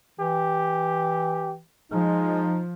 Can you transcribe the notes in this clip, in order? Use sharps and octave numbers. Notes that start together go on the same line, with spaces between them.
E3 G4
F3 G#3 D#4